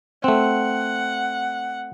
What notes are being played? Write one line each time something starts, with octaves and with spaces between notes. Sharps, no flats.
A3 C4 F#5